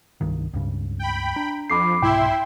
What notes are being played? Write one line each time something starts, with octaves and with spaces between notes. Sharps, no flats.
C2 G2 D#3
C#2 G2 C#3
G5 B5
D4 A#5
F2 B5 D6 C7
C2 G#2 B2 E4 E5 G5 C6